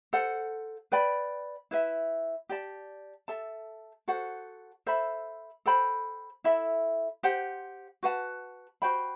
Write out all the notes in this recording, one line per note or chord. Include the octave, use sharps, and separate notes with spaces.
A4 C5 F#5
B4 D5 G5 B5
E4 B4 E5
G4 D5 A5
A4 E5 A5
F#4 A4 C5 F#5
A4 C5 E5 B5
A4 C5 G5 B5
E4 A4 E5 B5
G4 C5 F#5
F#4 B4 F#5 A5
F#4 C5 G5 B5